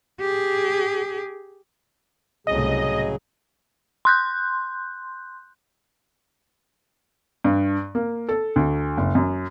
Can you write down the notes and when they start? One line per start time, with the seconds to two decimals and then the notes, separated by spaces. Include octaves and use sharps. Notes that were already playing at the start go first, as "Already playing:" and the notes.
0.20 G4 G#4
2.47 C2 A2 C#3 F#3 G#4 D#5
4.05 C6 F#6 G6
7.44 G2
7.95 A#3
8.29 A4
8.56 D2
8.97 F#1
9.15 F#2